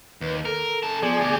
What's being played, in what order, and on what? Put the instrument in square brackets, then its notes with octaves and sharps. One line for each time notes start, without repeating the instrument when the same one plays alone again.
[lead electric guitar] D#2 [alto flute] B4
[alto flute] A4 [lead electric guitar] A#4
[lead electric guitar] C#3 A5
[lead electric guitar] F3 [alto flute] B3 [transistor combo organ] G#4 D5 G#5
[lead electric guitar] D2 G4